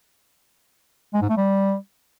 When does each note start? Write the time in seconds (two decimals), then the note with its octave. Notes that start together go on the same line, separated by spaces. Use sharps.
1.14 G#3
1.21 G#2
1.29 A3
1.37 G3